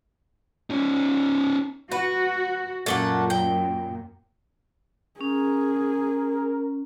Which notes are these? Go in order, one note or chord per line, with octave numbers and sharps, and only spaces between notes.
C#4 D#4
F#4 B4
F#2 A#2 A3 A#3 F#5
G5
C#4 G#4 A#4